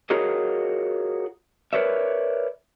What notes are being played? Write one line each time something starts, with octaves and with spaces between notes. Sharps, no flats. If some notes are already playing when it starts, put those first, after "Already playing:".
F4 F#4 G#4 A#4 C#5 D#5
A#4 B4 C#5 D5 E5